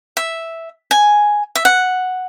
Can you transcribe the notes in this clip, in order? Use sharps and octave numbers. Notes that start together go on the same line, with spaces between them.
E5
G#5
E5
F#5